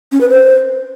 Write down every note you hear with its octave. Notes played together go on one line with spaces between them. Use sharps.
C#4
B4
C5